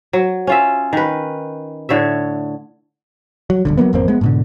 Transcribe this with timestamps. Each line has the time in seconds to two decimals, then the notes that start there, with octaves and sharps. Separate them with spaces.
0.13 F#3
0.47 C#4 F4 E5
0.93 D#3 B4
1.89 A2 D3 C#5 E5
3.50 F#3
3.65 D#1 C#2 D3
3.78 F#3 G3 A#3 B3
3.93 G#1 F2 A#3 C4
4.08 G#3 B3
4.21 G#2 B2 D3